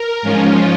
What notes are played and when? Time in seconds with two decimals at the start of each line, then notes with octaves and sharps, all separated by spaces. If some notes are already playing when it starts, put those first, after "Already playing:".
Already playing: A#4
0.22 G#2 F3 G#3 C#4 F4